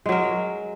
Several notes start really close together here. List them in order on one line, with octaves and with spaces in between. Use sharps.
G#3 F#3 A#4